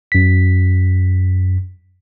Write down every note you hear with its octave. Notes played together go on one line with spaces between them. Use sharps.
F#2 B6